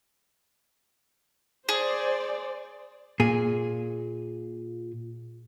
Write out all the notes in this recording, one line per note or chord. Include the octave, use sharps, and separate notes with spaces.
G#4 C5 D5
A#2 G#4